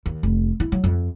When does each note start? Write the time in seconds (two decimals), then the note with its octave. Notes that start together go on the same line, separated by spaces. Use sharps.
0.06 D#2
0.23 F1
0.60 E4
0.72 F#3
0.84 F2